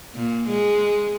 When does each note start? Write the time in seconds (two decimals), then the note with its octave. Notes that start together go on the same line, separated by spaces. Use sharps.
0.15 A#2
0.48 G#3